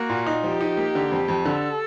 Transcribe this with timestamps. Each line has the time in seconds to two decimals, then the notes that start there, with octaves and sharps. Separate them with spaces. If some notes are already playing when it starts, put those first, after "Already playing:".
Already playing: A#3 F#4
0.10 A#2
0.26 D#4
0.43 F3 G4
0.61 D#4
0.77 A#3
0.95 D3
1.12 F2
1.28 F2
1.45 D3 A4